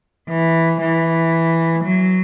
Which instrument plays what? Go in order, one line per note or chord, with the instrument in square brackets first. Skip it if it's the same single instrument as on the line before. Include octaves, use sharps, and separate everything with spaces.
[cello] E3
E3
F#3